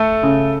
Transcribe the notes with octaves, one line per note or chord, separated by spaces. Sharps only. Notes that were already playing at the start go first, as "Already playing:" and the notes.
Already playing: A3 A4
C#3